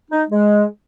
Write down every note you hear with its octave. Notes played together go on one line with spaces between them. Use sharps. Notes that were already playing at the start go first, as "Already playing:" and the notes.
D#4
G#3